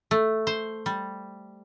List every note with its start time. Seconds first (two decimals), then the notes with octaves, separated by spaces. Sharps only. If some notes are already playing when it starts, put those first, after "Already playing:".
0.11 A3
0.47 C5
0.86 G3